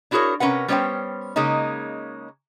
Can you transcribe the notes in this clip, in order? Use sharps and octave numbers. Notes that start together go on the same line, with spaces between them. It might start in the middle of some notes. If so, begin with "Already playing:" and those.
D4 E4 F#4 G#4 A#4 C#5
C3 C#4 A#4 B4 F#5
G3 B3 C#4 C5 C#5 G5
C#3 G#3 A#3 C#4 D#4